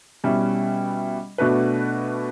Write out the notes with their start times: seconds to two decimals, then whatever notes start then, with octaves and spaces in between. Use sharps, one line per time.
0.24 B2 G3 C#4 E4
1.38 B2 A3 D4 F#4 B4